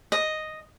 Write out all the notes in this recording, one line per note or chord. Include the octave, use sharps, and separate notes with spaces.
D#5